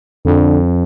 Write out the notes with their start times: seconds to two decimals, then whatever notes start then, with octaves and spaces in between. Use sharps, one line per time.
0.25 F2 D3